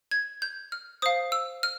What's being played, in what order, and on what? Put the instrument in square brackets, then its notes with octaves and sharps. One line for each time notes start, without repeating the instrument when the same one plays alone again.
[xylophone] G#6
G6
F6
C5 F5 D#6
E6
F6